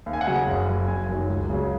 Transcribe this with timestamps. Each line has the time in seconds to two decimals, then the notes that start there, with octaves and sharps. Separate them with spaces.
0.06 D#2
0.13 G#5
0.21 F#5
0.27 C#3 F#3 G#5
0.47 F#1
0.68 F#2 F#3
0.88 F#1 G#5
1.09 F#2 D#3 F#3
1.29 C#2
1.50 C#3 F#3